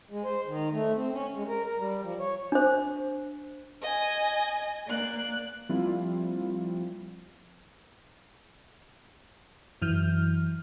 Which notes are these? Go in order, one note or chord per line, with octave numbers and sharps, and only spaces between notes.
G#3
C5
D#3
A3
C4
C#4
G#3
A#4
A#4
G3
F3
C#5
D4 C5
D#5 G#5
A#3 D5 F#6
F3 G3 A#3 C4 E4 F4
F#2 E3 F6 G6